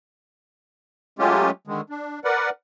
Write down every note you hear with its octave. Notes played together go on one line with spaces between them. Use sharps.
F#3 G#3 A3 C#4 F4 G4
D3 D#3 G#3
D4
A#4 B4 D5 F#5